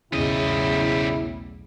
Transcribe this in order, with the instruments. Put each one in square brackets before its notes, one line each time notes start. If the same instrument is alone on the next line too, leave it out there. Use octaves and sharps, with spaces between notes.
[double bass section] B1 E2 A2 [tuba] C#3 [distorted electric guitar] G3 D#5 [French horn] E4